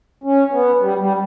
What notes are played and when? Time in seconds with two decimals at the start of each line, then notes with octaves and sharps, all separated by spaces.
0.24 C#4
0.52 B3
0.81 G3
1.00 G3